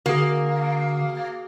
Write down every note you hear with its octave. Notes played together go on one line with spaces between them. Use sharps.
D3 A#3 F#4 G#4